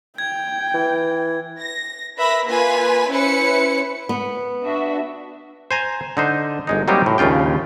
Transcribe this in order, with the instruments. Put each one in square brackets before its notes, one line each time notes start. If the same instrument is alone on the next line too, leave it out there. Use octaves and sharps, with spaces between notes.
[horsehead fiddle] G5 [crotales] G#6
[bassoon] E3
[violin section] A#6
A#4 B4 E5 B5 A#6
A#3 F4 B4 G#5 B6
C#4 E4 B4 C5 C#7
[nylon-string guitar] B3
[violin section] D4 F#4 E5
[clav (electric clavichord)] C5 G#5 A#5
D3 D#4 C5
G1 G#3 D#4
F#3 G3 A#3 C4 D#4 G4
A2
A#1 D#2 C#3 F4 G5